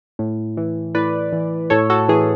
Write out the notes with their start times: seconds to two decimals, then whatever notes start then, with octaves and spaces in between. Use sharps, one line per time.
0.19 A2
0.57 E3
0.95 A2 B4 D5
1.33 E3
1.70 A2 A4 C#5
1.90 F#4 A4
2.09 E3 G#4